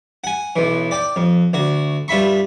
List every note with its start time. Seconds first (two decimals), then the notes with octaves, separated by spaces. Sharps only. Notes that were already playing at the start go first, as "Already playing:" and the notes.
0.24 F#5 G#5
0.56 B1 E3
0.91 D5 G5 D6
1.16 F2
1.53 D2 F#4
2.08 G2 F4 E5 B5 C#6